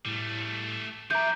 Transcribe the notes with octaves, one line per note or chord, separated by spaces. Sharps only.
A2 G3 A3
F3 D5 E5 A#5 G6